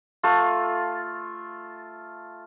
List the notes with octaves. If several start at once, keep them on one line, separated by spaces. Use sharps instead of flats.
A3 F4